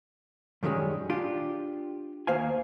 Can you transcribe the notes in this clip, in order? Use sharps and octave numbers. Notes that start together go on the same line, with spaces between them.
F#2 D#3 G3 G#3 C#4
D4 F4 G4
D#2 A#3 C5 F5 G#5